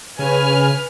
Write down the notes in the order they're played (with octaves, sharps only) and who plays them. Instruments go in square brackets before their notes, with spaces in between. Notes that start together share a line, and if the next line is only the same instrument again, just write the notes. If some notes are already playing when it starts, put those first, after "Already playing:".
[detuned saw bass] C#3 [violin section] B4 G#5 F6